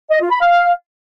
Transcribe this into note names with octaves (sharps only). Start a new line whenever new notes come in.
D#5
F4
B5
F5